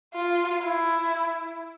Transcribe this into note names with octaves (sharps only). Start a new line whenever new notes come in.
F4
E4